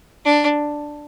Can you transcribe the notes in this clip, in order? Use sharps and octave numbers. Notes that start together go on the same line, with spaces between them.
D4